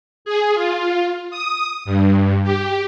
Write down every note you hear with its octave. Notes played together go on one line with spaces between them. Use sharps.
G#4
F4
D#6
G2
G4